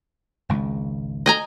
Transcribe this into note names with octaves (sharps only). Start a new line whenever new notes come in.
G#1 C#2 G#2
D#5 G#5 A#5